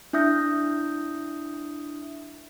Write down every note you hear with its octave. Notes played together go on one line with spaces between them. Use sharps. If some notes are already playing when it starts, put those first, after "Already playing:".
D4 E4 E5 D#6 G6 A#6